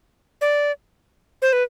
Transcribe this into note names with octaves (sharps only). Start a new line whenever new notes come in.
D5
C5
B4